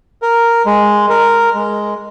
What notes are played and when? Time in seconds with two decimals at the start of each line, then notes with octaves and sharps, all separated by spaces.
0.22 A#4
0.66 G#3
1.10 A#4
1.55 G#3